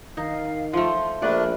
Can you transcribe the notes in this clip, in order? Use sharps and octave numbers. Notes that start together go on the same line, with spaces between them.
D#3 D#4 F5
F3 A3 C6
A#1 A3 D4 A#4 B4 D5